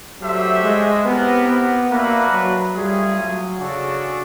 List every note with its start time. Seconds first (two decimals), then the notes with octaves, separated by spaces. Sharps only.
0.20 F#3 A3 D4 G4 C5 E5
0.62 G#3
1.04 B3 C4 E4 G4 A#4
1.46 B3
1.88 A#3 D4 F#4 B4 E5
2.31 F#3
2.73 G3 A3 C#4 F4 G#4
3.16 F#3
3.57 C#3 D4 F#4 A4